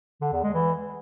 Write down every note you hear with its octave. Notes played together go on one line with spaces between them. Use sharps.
D3
E2
G#3
E3